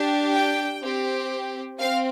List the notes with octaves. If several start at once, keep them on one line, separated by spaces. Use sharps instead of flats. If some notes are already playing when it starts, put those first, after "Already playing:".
Already playing: D4 G4
G5
C4 G4
C4 F5